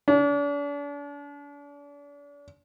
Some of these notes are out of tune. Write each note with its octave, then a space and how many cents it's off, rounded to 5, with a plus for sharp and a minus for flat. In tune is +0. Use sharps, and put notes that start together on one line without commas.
D4 -40